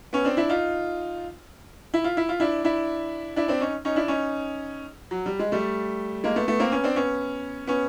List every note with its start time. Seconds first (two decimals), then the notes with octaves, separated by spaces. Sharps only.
0.13 B3 C#4
0.25 C4 D4
0.37 D4 E4
0.49 D#4 F4
1.94 E4
2.04 F4
2.17 E4
2.29 F4
2.40 D4 E4
2.64 D4 E4
3.36 D4 E4
3.48 C4 D4
3.60 C#4 D#4
3.85 C#4 D#4
3.96 D4 E4
4.08 C#4 D#4
5.11 F#3
5.26 G3
5.39 G#3
5.52 G3 A3
6.24 G#3 A#3
6.36 A3 B3
6.48 A3 B3
6.60 A#3 C4
6.72 B3 C#4
6.84 C4 D4
6.96 B3 C#4
7.67 B3 C#4